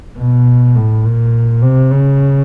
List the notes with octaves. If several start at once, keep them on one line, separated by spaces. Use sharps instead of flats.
B2
A2
A#2
C3
C#3